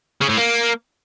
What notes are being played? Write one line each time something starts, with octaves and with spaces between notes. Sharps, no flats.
C#3
A2
A#3